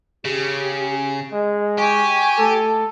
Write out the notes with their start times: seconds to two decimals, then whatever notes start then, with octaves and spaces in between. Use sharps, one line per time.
0.25 C#3 G4
1.33 G#3 D#5
1.78 G4 G#5 C#6
2.38 A3 A4